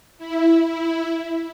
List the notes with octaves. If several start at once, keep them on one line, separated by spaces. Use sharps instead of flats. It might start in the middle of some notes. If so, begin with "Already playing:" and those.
E4
E4